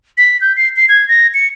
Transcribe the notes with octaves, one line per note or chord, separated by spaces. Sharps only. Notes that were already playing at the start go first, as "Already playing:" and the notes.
B6
G6
C7
C7
G#6
A#6
C#7